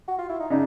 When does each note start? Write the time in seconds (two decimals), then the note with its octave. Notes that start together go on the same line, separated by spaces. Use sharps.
0.08 F#4
0.18 F4
0.29 E4
0.40 D#4
0.50 C#3 D4 D#4